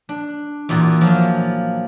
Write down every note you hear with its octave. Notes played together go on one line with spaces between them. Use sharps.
D4
E2 A#2 F#4
F3 F#3